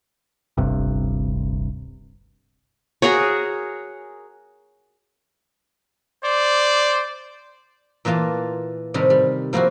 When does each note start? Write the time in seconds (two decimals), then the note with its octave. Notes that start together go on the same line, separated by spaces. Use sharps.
0.57 D1 G1 G2 C3
3.02 F#4 G#4 A#4 C#5
6.23 C5 D5
8.05 A#2 E3 A#3 F4 A5
8.94 A2 C3 D#3 G3 A#4
9.10 G3
9.53 F3 A#3 C4 E4 F#4